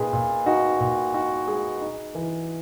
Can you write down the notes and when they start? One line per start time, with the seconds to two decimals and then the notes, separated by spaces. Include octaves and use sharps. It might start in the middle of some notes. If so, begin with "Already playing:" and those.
Already playing: A#2 G#3 D#4 G#4 B4 D#5
0.13 A#2
0.46 D#4 F#4
0.80 A#2
1.14 D#4 F#4
1.47 G#3 G#4
1.81 D#4
2.15 E3